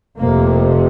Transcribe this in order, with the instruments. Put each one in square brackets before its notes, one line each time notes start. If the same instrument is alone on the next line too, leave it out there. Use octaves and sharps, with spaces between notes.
[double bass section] F1 F2 C3 A#3